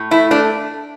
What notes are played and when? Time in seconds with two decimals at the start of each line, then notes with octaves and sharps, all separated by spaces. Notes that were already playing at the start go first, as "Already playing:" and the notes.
Already playing: A2
0.11 A3 E4
0.31 A3 D4